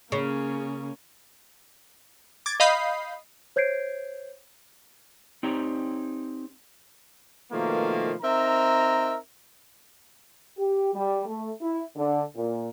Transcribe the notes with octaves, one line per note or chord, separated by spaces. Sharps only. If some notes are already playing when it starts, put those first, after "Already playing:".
C#3 A#3 C#4
D6 G#6 A6
D#5 F5 B5 D#6 G6 C7
C5 C#5 G6 G#6 C7 D7
C4 D#4 G4 C#5 D5 A#5
B2 D#3 F3 A3 A#3
C4 D#4 A#4 E5 A#5
G4
G3
A3
E4
D3
A#2